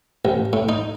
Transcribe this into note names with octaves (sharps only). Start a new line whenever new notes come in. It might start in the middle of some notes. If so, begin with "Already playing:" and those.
A1
A2
D#4